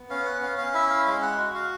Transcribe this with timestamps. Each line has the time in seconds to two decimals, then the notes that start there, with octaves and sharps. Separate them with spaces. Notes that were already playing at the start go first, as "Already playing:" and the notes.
Already playing: B3
0.10 C#4 F5
0.26 F#5
0.42 C#4 F5
0.58 F5
0.74 E4 E5
0.90 F5
1.07 G#3 F5
1.22 F#5
1.38 F#4
1.55 F5